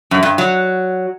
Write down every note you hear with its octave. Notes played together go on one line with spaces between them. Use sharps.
F#2
G2
F#3